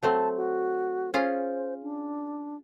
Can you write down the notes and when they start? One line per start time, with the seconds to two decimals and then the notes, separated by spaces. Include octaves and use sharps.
0.03 F#3 A3 C4 A5
0.37 F#4
1.14 C#4 F4 G#4 C5
1.83 D4